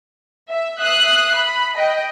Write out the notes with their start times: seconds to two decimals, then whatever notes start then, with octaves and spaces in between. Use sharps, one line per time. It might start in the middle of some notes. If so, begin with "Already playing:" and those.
0.48 E5
0.80 E5 D#6 F#6 C7
1.35 B5
1.75 D#5 G5